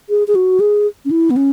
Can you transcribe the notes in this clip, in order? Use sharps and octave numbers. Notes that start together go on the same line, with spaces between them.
G#4
G#4
F#4
G#4
C#4
E4
B3
C#4